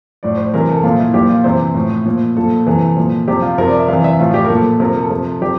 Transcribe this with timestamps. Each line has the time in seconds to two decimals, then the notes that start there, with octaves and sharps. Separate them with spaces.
0.23 A2 F3 D5
0.37 C5
0.53 C3 E3 A#4
0.69 A4
0.83 A#2 F3 F4
0.99 E4
1.14 A#2 F3 G4
1.29 F4
1.44 C3 E3 C5
1.75 A2 F3
2.05 A#2 F3
2.36 A#2 F3 A4
2.66 C3 E3
2.97 A#2 F3
3.28 C3 F3 G4
3.42 F4
3.58 C3 F3 A#4
3.68 D5
3.79 E5
3.88 C3 E3 F5
4.04 E5
4.19 A2 F3 F4
4.34 G4
4.44 A#4
4.49 A#2 F3 A4
4.80 C3 F3 A#4
4.96 A4
5.10 C3 F3 A4
5.41 C3 F3 G4